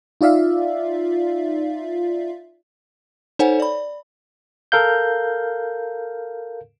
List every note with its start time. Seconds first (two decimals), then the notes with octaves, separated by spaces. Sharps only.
0.21 D#4 F4 D5 E5 F5
3.39 D#4 A4 C5 C#5 F#5 G#5
3.60 D5 B5
4.72 A4 A#4 F5 G6